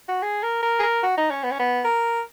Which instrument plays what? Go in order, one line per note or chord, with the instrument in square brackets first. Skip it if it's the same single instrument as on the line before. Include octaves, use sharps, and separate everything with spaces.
[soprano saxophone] F#4
G#4
A#4
A#4
G#4
A#4
F#4
D#4
C#4
B3
C#4
B3
A#4